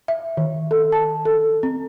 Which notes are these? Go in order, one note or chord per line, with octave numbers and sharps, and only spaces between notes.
E5
D#3
A4
A5
A4
C4